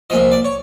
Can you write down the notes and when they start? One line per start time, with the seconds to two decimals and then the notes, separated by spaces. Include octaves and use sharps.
0.10 C2 A#2 F3 D#5
0.32 D5
0.45 C#5